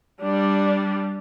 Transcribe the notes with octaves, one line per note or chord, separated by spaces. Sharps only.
G3 D4